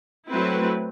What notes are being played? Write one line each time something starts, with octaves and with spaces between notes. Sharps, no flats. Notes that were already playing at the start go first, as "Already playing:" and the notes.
F#3 A3 C4 E4 B4